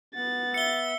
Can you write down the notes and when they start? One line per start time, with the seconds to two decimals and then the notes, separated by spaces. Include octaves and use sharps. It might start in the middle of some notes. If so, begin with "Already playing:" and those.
0.15 B3 F#5 A6
0.54 E5 C#7 G7